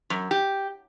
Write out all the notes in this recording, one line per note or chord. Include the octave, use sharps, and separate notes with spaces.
F#2
G4